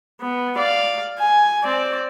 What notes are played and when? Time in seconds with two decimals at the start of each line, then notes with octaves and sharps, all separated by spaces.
0.21 B3
0.58 D5 F5
1.19 G#5
1.63 C4 D5